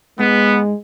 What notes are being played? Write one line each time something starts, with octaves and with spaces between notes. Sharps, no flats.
G#2 G#3 B3